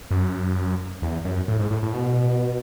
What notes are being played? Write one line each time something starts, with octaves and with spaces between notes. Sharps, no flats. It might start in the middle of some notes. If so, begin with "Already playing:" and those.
F#2
E2
F#2
A2
G#2
A2
A2
B2